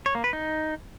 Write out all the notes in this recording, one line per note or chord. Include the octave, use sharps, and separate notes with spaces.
C#5
A#3
B4
D#4